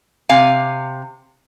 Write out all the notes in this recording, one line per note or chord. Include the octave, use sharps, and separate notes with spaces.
C3 F5 G#5